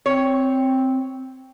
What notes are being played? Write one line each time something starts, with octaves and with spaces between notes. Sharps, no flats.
C4 C#5